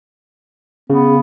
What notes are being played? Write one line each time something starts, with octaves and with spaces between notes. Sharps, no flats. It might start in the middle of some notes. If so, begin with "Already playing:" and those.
C#3 B3